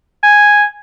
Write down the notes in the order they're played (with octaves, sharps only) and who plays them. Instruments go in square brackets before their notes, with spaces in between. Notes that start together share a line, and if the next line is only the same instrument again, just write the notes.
[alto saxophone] G#5